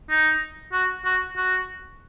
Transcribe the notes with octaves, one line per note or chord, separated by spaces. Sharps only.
D#4
F#4
F#4
F#4